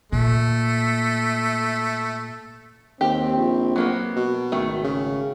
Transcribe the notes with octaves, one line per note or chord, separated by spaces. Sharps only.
A#2 A3
D#2 C4 G4
A#1
F#3 A#3 B3
B2
G#1 D#3 A3
C#3